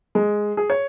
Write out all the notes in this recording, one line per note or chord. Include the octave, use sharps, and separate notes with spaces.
G#3
G#4
C#5